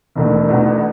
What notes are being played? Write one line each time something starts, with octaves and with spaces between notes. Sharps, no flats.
E1 D#2 D#3 A3
E1 E2 B2 A3 D#4